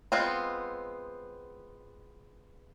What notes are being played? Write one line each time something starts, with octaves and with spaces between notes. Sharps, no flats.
G#3 B3 C4 F4